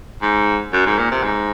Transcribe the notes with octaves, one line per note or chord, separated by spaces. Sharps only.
G#2
F#2
G#2
A#2
C3
G#2